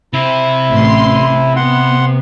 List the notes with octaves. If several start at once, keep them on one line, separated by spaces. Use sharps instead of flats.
C3 E4 C5
A1 A2 C6
B3 F#5 C6